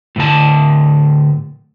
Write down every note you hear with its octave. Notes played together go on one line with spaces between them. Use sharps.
A2 D3 A5